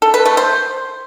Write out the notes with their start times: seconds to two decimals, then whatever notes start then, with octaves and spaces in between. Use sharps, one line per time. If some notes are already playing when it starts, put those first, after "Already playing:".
0.02 A4
0.14 B4
0.25 A3
0.37 C5